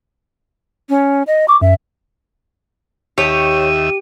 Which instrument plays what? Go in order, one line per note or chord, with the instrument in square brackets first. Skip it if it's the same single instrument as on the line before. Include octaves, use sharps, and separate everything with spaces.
[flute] C#4
D#5
[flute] C#6 [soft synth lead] D6
[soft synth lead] F#2 [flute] E5
[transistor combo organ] D#2 E5 [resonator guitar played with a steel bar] G4 [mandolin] C#5 [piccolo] D#7